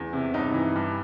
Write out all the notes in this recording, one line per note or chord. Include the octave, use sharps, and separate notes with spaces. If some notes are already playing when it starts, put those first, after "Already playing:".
Already playing: E2
C3
G2 D#4
E3
G2